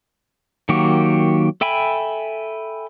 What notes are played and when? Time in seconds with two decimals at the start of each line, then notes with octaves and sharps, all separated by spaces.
0.69 D#3 F#3 A#3 F#4 G4
1.61 A4 E5 G5 G#5 B5